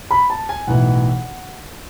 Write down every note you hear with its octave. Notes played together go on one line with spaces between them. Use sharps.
B5
A5
G#5
B1 A2 E3 F#5